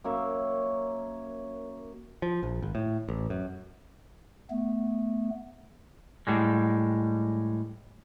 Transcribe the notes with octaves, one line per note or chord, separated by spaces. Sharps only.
F#2 A#3 C#5 E5
F3
A#1
G#1
A2
A1
F#2
A3 B3
A2 G3 G#3